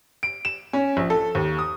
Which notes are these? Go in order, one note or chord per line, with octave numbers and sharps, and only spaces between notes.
D7
E7
C#4
A#1
A4
D#2
D#6